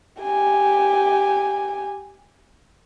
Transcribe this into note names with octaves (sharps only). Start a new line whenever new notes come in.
G4 G#5